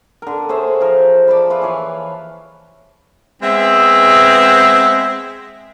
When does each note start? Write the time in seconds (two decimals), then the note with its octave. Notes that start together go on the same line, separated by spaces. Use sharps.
0.22 D3 A#4
0.49 G#4 C5 C#5 E5
0.81 F3 A#4
1.28 D5 A5 B5
1.50 F4 B4 D5 E5
1.62 E3 C#5 F5
3.42 G#3 B3 C4 E5